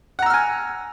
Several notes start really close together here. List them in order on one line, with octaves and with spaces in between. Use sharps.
F#5 A#5 E6 F6 G#5